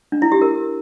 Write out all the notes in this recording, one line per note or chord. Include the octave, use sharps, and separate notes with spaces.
D4
E4
G4
A#4